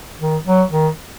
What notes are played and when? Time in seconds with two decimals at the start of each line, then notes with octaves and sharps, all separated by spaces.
0.20 D#3
0.45 F#3
0.71 D#3